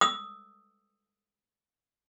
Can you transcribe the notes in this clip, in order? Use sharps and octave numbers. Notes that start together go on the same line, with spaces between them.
D#6 E6